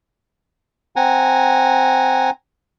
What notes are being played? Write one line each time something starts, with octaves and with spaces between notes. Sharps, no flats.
C4 F#5 G#5 A#5